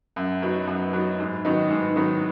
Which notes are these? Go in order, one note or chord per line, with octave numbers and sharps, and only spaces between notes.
F#2
F#3 B3 D#4
F#2
F#3 B3 D#4
G#2
D#3 F#3 B3 D#4
G#2
D#3 F#3 B3 D#4